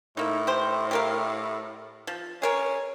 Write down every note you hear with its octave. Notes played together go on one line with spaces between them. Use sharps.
A2 A#3 D#4
G4 C5
G4 A#4 F5
F3
C#4 G#4 A#4 C#5